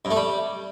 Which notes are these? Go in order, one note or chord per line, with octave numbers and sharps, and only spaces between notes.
G2
A3
G3